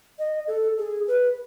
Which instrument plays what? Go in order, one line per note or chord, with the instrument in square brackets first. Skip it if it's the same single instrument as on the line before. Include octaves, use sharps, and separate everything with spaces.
[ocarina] D#5
A4
G#4
B4